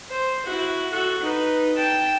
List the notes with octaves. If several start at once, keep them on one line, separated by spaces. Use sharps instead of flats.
C5
E4 F#4
F#4 A4
D#4 B4
G5 A5